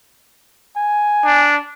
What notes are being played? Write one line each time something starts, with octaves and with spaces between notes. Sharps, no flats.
G#5
D4